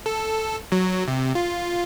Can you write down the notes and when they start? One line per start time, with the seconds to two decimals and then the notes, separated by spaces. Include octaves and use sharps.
0.06 A4
0.72 F#3
1.08 C3
1.35 F4